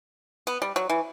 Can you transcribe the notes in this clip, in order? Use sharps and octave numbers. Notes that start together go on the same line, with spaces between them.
B3
G3
F#3
E3